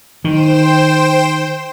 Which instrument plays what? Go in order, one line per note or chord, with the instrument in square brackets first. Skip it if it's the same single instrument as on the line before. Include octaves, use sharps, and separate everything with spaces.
[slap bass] D#3 [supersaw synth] C5 G5 E7